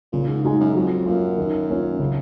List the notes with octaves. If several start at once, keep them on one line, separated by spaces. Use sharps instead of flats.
A#2 C#3
G#2
G#2 G#3 D#4 F#4
F#2
F2 F#3
F#2 A#3 F4
D#3
A#3 C#4 F4
C#3